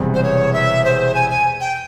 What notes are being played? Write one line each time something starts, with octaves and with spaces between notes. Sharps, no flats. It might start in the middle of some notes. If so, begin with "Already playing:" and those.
Already playing: E1 E2 C3 G3 C4
C5
C#5
E5
C5
G#5
G#5
G5